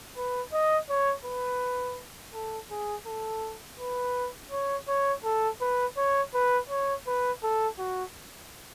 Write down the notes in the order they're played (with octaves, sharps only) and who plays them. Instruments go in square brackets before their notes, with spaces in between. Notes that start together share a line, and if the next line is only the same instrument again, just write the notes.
[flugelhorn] B4
D#5
C#5
B4
A4
G#4
A4
B4
C#5
C#5
A4
B4
C#5
B4
C#5
B4
A4
F#4